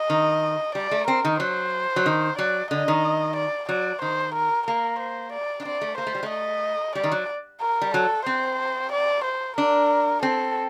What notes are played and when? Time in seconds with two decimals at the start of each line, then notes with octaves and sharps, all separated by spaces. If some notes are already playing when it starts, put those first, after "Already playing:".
Already playing: D#5
0.10 D#3
0.75 G3 D5
0.91 A3
1.08 C4 A#4
1.25 D#3
1.40 F#3 C5
1.96 F#3
2.06 D#3
2.38 F#3 D5
2.71 D3 D#5
2.88 D#3
3.36 D5
3.69 F#3 D5
4.02 D#3 C5
4.34 A#4
4.67 A#3 A#4
4.99 C5
5.33 D5
5.60 D4
5.65 C4 D5
5.81 A3
5.98 A#3 C5
6.07 A3
6.15 G3
6.23 A3
6.30 D#5
6.95 G3 D5
7.04 D#3
7.12 F#3
7.61 A#4
7.82 G3
7.94 F#3 A4
8.26 C4 C5
8.92 D5
9.24 C5
9.57 D4 A#4
10.22 C4 A4